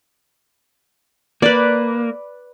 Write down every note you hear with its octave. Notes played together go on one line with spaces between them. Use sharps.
A#3 B4 D5